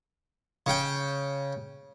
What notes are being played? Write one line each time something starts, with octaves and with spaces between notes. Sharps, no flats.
C#3 G5